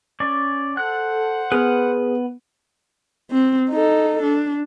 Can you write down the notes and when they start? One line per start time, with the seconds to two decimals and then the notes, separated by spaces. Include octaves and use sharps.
0.20 C#4 D5
0.77 A4 C5 F#5 F#6
1.52 B3 G#4 B4 F6
3.31 C4
3.70 D#4 A4
4.23 D4